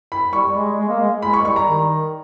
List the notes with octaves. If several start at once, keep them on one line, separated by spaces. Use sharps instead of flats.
B5
G3 C#6
G#3
G#3
A#3
G#3
G#3 B5
C#6
G3 C#6
A#5
D#3